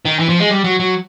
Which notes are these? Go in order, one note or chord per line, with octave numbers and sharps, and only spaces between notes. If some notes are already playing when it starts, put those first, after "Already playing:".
D#3
E3
F3
G#3
G3
F#3
F#3